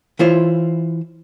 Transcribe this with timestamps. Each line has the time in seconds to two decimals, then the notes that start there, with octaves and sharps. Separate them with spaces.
0.19 E3 E4 F4 C5 C#5